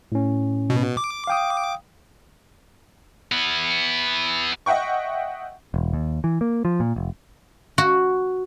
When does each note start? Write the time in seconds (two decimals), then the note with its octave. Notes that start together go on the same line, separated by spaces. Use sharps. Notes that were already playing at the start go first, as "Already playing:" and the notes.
0.12 A2 C#4
0.70 B2
0.97 D6
1.27 F5 G5 D#6
3.32 B3 E4
4.66 D#5 E5 F#5 G5 C#6
5.74 E1
5.93 D#2
6.24 E3
6.41 A#3
6.65 F3
6.80 A#2
6.96 F1
7.78 F#4